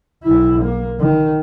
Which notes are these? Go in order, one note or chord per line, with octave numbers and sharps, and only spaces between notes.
B1 E4
A#3
D#3